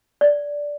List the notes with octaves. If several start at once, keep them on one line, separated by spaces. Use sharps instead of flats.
D5